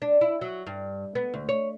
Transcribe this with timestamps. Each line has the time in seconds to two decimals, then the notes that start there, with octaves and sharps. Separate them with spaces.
0.02 D4
0.21 E4
0.41 F#3
0.67 G2
1.15 B3
1.34 D2
1.49 C#5